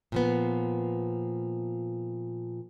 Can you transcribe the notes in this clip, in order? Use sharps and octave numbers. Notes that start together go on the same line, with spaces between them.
A#2 F3 B3